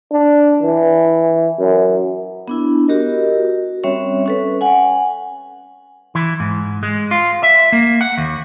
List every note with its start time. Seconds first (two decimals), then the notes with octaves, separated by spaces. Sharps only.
0.12 D4
0.63 E3
1.59 F#2
2.48 B3 D4 E4
2.88 F#4 G4 A#4 D#5
3.84 G3 C4 C#4 C#5 E5
4.26 C#4 A4 B4
4.61 F#5 G#5
6.15 E3
6.40 G#2
6.83 G#3
7.11 F4
7.43 E5
7.72 A#3
8.01 F#5
8.18 D#2